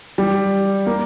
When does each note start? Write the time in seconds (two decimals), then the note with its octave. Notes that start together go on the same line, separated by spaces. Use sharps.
0.18 G3
0.86 A#3